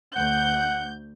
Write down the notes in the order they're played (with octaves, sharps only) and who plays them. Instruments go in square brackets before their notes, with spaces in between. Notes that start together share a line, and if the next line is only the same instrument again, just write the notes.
[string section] D2 G6 [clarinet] F#5